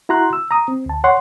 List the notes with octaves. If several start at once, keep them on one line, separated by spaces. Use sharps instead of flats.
E4 F#4 A#5 C6 F#6
E6
A#5 D#6
C4
D2 A5
C#5 F#5 C6